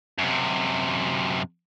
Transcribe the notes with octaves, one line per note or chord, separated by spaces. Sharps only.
F#2 C3